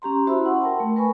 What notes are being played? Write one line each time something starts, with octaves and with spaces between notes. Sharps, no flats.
C#4 G4 A#5 C6
E4 F#4 C5 E5 B5 E6
F#5 C6 C#6
A#4 G5 A5
A3
A#4 B4 G#5 B5 C#6